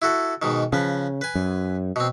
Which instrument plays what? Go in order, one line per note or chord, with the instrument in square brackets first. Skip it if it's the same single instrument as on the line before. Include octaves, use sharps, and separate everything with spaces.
[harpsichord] E4 F#4 A4
G#2 B2 D#3
[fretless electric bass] C#3 [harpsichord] F3 B4
[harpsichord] B4 G#5
[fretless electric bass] F#2
[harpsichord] B2 C4